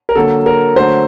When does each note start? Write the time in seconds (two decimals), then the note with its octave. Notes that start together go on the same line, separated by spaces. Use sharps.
0.09 A#4
0.15 D3 F#3 A#3 A4
0.46 A#4
0.75 D3 F#3 A3 C5